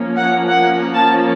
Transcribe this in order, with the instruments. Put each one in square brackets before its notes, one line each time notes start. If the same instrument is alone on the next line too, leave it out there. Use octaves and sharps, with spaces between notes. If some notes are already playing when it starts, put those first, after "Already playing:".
Already playing: [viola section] F3 A#3 C#4
F#5
F#5
A5